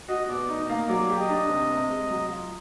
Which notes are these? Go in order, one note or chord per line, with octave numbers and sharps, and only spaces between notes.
F#4 D#5
B2 D5
D#4
D#5
A#3
F#3 D5
G4
D#5
D4
C3
C3
G#3
F#3
F4